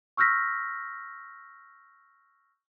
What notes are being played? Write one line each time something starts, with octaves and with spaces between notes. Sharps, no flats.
C#6 E6 F6 G6 A#6 B6